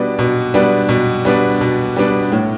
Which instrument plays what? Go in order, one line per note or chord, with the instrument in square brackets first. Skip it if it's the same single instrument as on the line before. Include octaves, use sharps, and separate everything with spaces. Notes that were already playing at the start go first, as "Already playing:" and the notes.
Already playing: [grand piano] B2 G3 B3 D4
B2
G3 B3 D4
B2
G3 B3 D4
B2
G3 B3 D4
A2